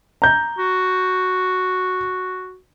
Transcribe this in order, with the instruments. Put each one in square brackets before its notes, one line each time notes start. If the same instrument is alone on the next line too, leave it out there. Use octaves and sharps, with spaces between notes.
[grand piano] A#5 G6
[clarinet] F#4